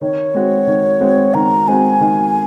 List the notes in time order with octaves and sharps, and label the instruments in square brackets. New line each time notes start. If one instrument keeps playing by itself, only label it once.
[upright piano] D#3 [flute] C#5
[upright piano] G#3 C4 F#4
D#3
G#3 C4 F#4
[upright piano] D#3 [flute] A#5
[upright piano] G#3 C4 F#4 [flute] G#5
[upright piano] D#3